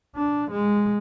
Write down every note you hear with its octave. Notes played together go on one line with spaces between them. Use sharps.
D4
G#3